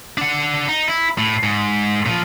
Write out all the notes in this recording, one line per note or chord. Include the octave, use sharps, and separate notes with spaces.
D4 F#5
D#4
E4
A2
G#2
A#2 F3